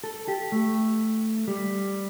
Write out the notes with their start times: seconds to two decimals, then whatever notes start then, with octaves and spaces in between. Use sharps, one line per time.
0.04 A4
0.28 G4
0.52 A3
1.48 G3